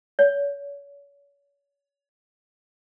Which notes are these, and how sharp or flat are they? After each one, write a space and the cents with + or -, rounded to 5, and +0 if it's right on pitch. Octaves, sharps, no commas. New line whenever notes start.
C#5 +35